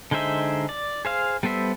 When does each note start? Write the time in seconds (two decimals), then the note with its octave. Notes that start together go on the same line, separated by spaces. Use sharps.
0.11 D3 G#3 D#4 C5 E5
0.69 D5
1.05 G#4 C5 F5
1.43 G3 B3 A4 C5 E5